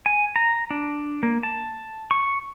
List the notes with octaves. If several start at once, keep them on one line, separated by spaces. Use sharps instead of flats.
G#5
A#5
D4
A#3
A5
C#6